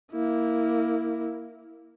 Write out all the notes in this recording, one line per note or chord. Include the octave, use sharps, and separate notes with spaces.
A#3 E4